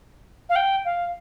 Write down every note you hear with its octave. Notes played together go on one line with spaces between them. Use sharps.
F5
G5
F5